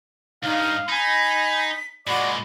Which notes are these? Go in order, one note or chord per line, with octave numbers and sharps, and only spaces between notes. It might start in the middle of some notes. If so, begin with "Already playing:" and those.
C#2 G2 D#4 F5
D#4 G#5 B5 B6
A#2 G#3 F#4 D5 B5 D6